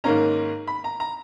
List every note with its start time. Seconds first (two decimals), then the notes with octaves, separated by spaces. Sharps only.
0.04 G#2 D#3 A#3 C#4 A#5
0.67 B5
0.84 A#5
1.00 A#5